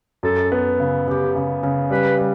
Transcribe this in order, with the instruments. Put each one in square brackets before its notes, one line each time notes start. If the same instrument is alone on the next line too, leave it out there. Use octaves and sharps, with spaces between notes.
[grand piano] F#2 [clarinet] A4
[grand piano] B3
C#3
[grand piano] C#3 [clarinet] G4
[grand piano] C#3
C#3
[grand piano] G3 [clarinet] B4
[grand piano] G3